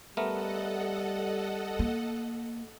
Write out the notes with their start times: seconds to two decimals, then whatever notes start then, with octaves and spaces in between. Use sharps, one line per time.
0.17 G3 A3 B3 A4 A#4 D#5 F#5
1.79 A#3